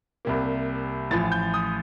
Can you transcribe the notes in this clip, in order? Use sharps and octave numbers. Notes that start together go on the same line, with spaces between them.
C2 C3 G3 A#3
A1 A2 F3 A6
G6
D#6